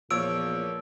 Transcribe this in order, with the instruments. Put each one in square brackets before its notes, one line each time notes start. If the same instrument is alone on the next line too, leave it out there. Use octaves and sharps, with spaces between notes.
[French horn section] E2 A#2 [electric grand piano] F3 A#3 C#5 [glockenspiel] E6 D7